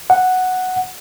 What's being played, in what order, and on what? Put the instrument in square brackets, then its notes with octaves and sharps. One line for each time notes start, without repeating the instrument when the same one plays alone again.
[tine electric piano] F#5